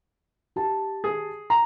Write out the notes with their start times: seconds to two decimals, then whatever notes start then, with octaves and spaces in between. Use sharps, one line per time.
0.56 G4 A5
1.04 G#4
1.50 A#5